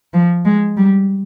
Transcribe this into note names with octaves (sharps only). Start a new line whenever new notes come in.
F3
G#3
G3